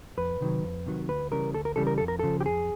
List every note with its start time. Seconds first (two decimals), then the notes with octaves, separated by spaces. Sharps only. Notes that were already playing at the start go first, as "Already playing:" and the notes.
0.17 F2 B4
0.41 C3 D#3 F#3
0.64 F2
0.86 C3 D#3 F#3
1.09 D2 B4
1.31 C#3 E3 G3 A#4
1.54 D2 A4
1.65 A#4
1.76 C#3 E3 G3 A4
1.87 A#4
1.98 F2 A4
2.08 A#4
2.19 C#3 F3 A4
2.41 G4
2.46 F2 G#4